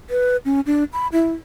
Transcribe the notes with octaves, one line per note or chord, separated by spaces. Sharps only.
B4
C#4
D4
B5
E4